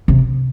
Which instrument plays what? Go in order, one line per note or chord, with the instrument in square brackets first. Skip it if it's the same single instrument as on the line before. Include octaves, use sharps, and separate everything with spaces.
[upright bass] C3